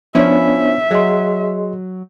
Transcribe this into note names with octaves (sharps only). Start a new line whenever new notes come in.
F3 B3 C#4 D4 E4 C#5 E5
F#3 G#4 D#5 C6